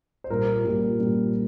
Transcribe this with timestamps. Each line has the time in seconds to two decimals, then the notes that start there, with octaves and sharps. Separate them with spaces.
0.24 C5
0.30 A#2 G3 A#3 A#4
0.64 A#2 G3 A#3
0.99 A#2 G3 A#3